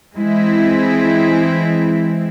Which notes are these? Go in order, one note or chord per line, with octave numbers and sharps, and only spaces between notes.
E3 G#3 C4 E4